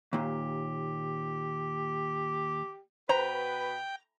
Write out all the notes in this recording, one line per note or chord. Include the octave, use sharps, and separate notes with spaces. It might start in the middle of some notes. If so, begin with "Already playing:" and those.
D#2 A#2 G4
B2 F#4 B4 C5 G5 A#5